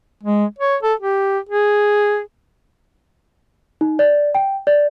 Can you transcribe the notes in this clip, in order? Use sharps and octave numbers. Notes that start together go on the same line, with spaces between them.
G#3
C#5
A4
G4
G#4
D#4
D5
G5
D5